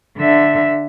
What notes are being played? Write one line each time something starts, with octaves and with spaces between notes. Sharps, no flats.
D3 E5